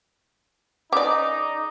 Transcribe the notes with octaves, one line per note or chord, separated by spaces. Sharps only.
C#3 D#4 D5 D6